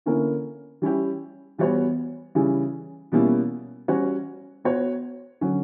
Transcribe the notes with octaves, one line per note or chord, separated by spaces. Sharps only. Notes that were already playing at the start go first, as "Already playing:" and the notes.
D3 A#3 C#4 E4 A#4
G3 C#4 E4 G4
E3 G3 B3 F#4 C#5
C#3 E3 G3 C#4 E4
B2 G3 A#3 C#4 E4
G3 C#4 F#4 C#5
B3 F#4 C#5
D3 F#3 C#4